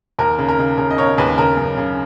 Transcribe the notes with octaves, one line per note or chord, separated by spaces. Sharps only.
D#2 A#4
C#3
A#4
C#3
C#3 A#4
D#5
C#3 A#4 C#5
D#2 G#4 B4
C#3 A#4
F#2
C#3